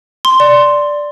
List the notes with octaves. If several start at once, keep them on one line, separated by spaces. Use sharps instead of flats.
C6
D5